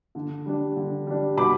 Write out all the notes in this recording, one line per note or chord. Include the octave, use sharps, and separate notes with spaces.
D3
G3 D4
D3
G3 D4
B2 B5 D6